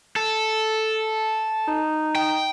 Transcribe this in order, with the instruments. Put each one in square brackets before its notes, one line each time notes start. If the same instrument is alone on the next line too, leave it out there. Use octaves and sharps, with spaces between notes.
[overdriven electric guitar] A4
[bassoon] D#4
[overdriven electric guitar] G5